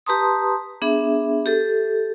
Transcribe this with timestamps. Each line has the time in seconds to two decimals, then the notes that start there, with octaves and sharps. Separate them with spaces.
0.06 G4 B4 A5 A#5 C6 D#6
0.82 B3 D4 G#4 E5
1.46 G4 A4